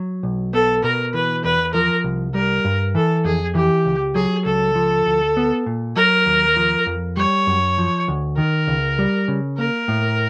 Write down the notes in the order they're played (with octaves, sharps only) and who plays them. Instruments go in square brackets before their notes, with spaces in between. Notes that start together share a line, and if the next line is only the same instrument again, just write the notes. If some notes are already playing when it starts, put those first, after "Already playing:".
Already playing: [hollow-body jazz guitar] F#3
B1
[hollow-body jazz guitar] B3 [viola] A4
[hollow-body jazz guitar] B2 [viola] A#4
[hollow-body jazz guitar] E3 [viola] B4
[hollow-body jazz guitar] E2 [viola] B4
[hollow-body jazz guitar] F3 [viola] A#4
[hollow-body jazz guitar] C2
[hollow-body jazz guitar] G3 [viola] A#4
[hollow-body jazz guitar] G2
[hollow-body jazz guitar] E3 [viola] A4
[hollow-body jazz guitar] F2 [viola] G#4
[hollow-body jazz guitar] E3 [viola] G4
[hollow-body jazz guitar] C#2
[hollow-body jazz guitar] F#3 [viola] G#4
[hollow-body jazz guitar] C#2 [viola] A4
[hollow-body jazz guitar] F3
D2
B3
A#2
[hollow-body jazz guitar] F#3 [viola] A#4
[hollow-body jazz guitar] D#2
F3
F2
[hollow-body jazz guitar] G3 [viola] C#5
[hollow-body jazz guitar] F#2
F3
D2
[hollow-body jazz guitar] D#3 [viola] A#4
[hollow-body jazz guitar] C#2
G3
C#3
[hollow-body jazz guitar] A#3 [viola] A#4
[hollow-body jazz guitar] A2